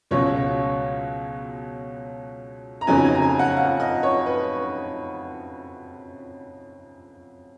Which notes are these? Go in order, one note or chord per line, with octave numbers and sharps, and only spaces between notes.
C#2 B2 F#3 C#4 F4 C#5
A#5
F2 C#3 F#3 B3 D#4 G#5
G#5
A#5
G#5
F#5
F5
D#5
C#5
B4